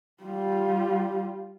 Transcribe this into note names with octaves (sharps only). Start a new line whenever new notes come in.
G3 F4